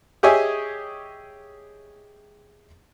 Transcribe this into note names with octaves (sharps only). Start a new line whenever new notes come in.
G4 G#4 C#5 D#5 E5 G#5